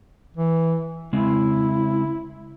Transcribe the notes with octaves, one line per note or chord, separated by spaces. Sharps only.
E3
C#3 G#3 C4 E4